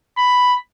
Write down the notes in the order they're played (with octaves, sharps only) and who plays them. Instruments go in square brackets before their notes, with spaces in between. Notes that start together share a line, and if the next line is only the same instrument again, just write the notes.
[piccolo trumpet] B5